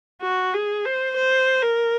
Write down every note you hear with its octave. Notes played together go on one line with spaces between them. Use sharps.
F#4
G#4
C5
C5
A#4